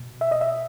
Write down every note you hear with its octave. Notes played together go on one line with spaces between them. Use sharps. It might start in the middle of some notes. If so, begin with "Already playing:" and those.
Already playing: B2
E5
D#5
E5